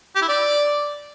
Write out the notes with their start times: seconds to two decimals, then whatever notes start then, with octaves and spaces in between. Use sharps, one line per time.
0.15 G4
0.22 E4
0.29 D5